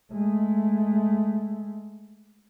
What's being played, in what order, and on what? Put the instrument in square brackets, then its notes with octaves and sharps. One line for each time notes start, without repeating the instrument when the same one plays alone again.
[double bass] G#3 A3